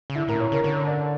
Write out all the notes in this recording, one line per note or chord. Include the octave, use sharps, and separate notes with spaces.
C#3
D3 E4
A2 A#4
A#2 C#5
C#3 A#4
D3 C#5
D5